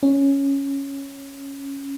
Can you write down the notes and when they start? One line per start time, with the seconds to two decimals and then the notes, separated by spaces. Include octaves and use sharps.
0.03 C#4